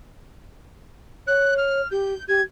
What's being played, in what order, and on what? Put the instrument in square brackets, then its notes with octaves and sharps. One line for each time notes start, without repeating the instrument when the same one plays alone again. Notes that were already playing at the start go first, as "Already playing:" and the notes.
[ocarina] C#5 [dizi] F#6
[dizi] F6
[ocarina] G4 [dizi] G6
[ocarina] G4 [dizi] G#6